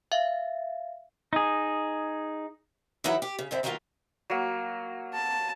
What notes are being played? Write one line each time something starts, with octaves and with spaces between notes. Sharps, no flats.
E5 F5
D#4 G#4
E3 F#3 D#4 E4 F#4 C#5
G4
C#3
F2 D3 C4 E4
D#3 F#3 A#3 B3 D#4 F4
F#3 A#3
A5